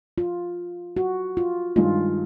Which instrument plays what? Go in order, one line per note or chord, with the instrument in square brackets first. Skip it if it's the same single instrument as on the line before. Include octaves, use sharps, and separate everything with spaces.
[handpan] F4
F#4
F4
[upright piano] G2 D#3 G#3 [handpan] F4